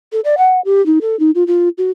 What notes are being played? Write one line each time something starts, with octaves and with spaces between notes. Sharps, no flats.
A4
D5
F#5
G4
D#4
A4
D#4
F4
F4
F#4